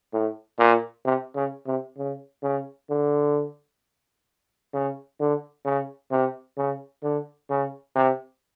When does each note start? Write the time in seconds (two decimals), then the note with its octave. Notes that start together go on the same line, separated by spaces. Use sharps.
0.13 A2
0.59 A#2
1.05 C3
1.36 C#3
1.67 C3
1.98 C#3
2.43 C#3
2.90 D3
4.74 C#3
5.20 D3
5.65 C#3
6.11 C3
6.57 C#3
7.03 D3
7.50 C#3
7.96 C3